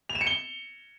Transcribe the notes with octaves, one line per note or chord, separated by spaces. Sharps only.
F7
E7
C#7
G7